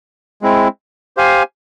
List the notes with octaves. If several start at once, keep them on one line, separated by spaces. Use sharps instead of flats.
G#3 C4 E4
G4 C5 F5 G#5